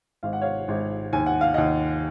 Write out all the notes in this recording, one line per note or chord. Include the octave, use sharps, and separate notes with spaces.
G#1 F5
F#5
C#5 F5
G#1
D#2 G#5
F#5
F5
D#2 D#5 F#5